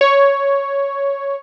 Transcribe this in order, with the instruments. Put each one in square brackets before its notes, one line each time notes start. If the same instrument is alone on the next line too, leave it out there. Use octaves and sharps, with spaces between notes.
[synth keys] C#5